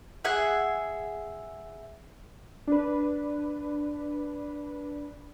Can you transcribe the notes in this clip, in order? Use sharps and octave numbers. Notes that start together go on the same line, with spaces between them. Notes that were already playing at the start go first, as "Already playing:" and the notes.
G#4 E5 F#5
D4 B4